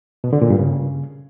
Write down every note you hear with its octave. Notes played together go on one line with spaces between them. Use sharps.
B2
D3
A#2
G2
C#3